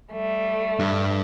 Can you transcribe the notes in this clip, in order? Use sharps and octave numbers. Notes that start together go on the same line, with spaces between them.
G3 A3
G2